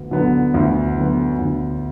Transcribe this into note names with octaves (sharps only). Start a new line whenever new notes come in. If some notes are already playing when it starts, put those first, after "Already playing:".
Already playing: D2 D3 B3
D3 F#3 B3
D2
D3 F#3 B3
D2